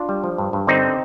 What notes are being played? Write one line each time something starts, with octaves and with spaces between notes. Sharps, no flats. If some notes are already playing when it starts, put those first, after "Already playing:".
Already playing: D4 F4
G3
F3
G2
G2
D3 C4 D#4